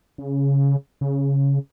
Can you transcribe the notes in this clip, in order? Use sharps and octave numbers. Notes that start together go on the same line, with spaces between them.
C#3
C#3